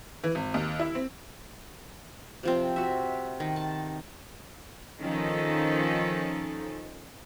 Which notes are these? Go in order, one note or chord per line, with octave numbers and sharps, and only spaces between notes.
E3
G#1
D#2
E4
C4
C3 F3 C4
F#4 E5
D#3
A5
D#3 F3 C#4 D#4 A4